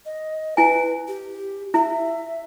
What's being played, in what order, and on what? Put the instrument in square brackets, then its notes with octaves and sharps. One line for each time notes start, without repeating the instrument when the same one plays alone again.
[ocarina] D#5
[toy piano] E4 G#5 [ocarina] B4
[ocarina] G4
[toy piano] E4 [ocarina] E5